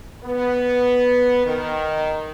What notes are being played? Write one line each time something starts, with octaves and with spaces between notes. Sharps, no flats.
B3
D#3